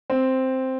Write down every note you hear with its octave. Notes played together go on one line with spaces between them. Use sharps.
C4